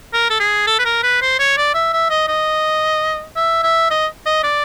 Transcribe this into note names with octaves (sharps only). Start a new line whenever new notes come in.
A#4
A4
G#4
A4
B4
A#4
B4
C5
C#5
D5
E5
E5
D#5
D#5
E5
E5
D#5
D#5
D5